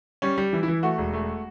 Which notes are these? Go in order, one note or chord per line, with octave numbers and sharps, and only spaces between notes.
G3 C#4
G3
E3
E4
E3
A3 F#4
E1
A3